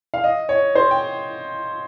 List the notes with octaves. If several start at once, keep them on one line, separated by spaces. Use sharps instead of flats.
F5
D#5
C#5
C5
G5